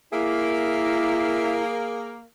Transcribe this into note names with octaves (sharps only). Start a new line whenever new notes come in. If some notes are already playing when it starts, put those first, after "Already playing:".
A#3 E4 G#4 E5